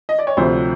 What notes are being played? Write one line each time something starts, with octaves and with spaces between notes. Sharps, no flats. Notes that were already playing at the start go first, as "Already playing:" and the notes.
D#5
D5
C#5
D2 C3 F3 C5